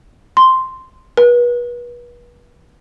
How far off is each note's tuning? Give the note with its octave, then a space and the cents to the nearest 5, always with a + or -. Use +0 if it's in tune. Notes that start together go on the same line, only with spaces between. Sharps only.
C6 -5
B4 -35